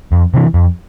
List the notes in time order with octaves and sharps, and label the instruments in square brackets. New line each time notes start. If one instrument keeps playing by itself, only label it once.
[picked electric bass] F2
C3 E3
F2